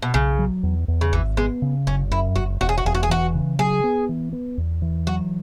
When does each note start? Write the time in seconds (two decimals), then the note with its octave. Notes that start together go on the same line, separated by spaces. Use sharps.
0.03 B2
0.14 B1 C#3
0.39 F#3
0.63 E2
0.88 E2
1.01 C#3
1.13 G#1 E3
1.37 G#3 B3
1.62 C#3
1.87 F#1 C#4
2.11 F#2 E4
2.36 F#1 F#4
2.61 E1 F#4
2.69 G#4
2.78 F#4
2.85 E1 G#4
2.95 F#4
3.03 G#4
3.10 E3 F#4
3.35 C#3
3.59 F#3 G#4
3.84 B3
4.09 E3
4.33 B3
4.58 E2
4.82 E3
5.07 F#3 F#4